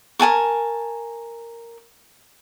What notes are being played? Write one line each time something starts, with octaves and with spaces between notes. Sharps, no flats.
A#4 G#5 A5 C#6